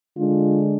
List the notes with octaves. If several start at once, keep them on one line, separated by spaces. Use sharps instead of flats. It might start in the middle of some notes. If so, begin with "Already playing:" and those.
D3 G#3 D4 F4